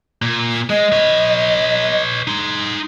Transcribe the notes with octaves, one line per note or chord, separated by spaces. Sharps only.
A#2
G#3 D#5
B4 C#5
D#4 C6